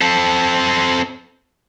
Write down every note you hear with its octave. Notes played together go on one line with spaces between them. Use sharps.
C4 A4